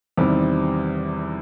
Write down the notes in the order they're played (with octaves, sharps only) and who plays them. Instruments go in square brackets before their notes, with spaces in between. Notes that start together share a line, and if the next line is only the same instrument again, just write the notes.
[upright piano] E2 C3 D#3 G3 C4